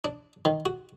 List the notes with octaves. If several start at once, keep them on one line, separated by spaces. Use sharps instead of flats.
D4
D#3
F#4